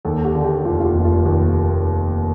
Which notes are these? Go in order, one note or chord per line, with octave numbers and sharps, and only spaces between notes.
D#2 A4
A4
G4
D3
G4
F1 F4
F4
G4
F1
F4
D#2 G4